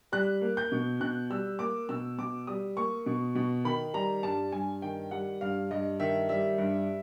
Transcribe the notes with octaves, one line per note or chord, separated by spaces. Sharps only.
G3 F#6
A#3
G6
B2
B2 F#6
G3 E6
A#3 D6
B2 E6
B2 D6
G3 D#6
A#3 C#6
B2
B2
D#3 B5
G3 A#5
G2 A5
G2 G#5
D#3 G5
G3 F#5
G2 F5
G2 D#5
D#3 E5
G3 E5
G2